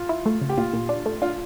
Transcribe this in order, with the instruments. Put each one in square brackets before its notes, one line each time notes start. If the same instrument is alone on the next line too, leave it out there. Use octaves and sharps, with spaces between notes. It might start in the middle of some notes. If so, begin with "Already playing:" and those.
Already playing: [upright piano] F4
[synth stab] E4
A3
C#3
[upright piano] G4
[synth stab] A#2 [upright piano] F4
[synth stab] A#2
D4
A3
[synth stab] D4 [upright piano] F4